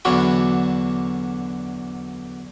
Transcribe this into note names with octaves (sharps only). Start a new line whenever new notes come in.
E2 D3 F#3 D4 F#4 B5